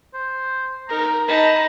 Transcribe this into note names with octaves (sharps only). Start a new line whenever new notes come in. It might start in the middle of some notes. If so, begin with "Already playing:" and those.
C5
D#4 A#4 A#5
D#4 A5 B5